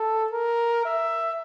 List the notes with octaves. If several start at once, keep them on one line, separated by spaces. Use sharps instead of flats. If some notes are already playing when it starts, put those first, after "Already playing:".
Already playing: A4
A#4
E5